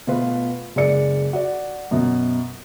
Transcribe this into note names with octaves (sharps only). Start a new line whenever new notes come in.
B2 A3 F4 B4
F#1 G#3 D5 C#7
F#4 D5
F#2 B2